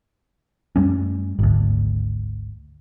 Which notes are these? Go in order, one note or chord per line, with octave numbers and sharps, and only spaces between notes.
F#2 G3 A3 C#4
G#1 D2